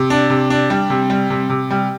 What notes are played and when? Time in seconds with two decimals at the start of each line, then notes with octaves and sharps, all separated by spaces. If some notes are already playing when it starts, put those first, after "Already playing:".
Already playing: C3
0.10 D4
0.30 C3
0.50 D4
0.70 G3
0.90 C3
1.10 G3
1.30 C3
1.50 C3
1.71 G3